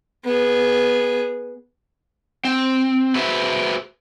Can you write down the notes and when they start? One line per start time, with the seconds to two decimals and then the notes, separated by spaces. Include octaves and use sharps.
0.25 B3 G#4
2.45 C4
3.15 F#4 G#4 B4 C5 E5